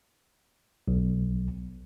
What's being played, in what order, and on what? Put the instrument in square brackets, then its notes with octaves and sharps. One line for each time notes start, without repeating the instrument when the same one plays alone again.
[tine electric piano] B1